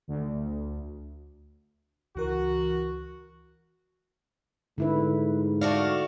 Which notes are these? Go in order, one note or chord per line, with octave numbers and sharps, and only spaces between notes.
D2
C#2 E3 F#4 A#4
G#2 D3 E4 B4
A3 F#4 D5 F5